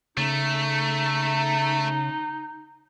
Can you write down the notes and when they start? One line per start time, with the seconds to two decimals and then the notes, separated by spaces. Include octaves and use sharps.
0.18 C#3 A3 D#4